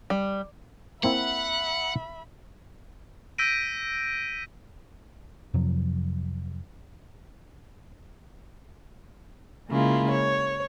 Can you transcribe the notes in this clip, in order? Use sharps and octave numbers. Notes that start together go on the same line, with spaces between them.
G3
A#3 C4 E4 E5 F#5 B5
E6 G6 A#6 B6 D7 D#7
F2 C3 F3 F#3
C#3 G#3 A#3 E4 F4
C#5